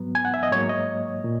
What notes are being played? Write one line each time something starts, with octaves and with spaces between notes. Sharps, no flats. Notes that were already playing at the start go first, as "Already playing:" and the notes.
Already playing: G#2 F#3 B3
G#5
F#5
E5
D#5
G#2 F#3 A#3 C#5
D#5
A#2